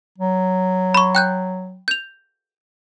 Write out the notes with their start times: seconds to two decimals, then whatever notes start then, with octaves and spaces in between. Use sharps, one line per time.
0.18 F#3
0.94 B5 C#6
1.15 G5 F#6 G6
1.88 G6 F7